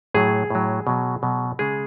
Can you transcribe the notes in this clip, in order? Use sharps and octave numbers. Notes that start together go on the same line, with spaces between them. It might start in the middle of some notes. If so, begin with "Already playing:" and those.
A2 F#3 G#4
A2 F#3
B2 F#3
B2 F#3
C#3 G#3 G#4